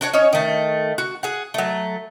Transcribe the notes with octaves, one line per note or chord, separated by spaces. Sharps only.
D4 F#4 C#5
C#4 D#4 C#5
D#3 A3
F#4
G#4 F#5
F#3 A3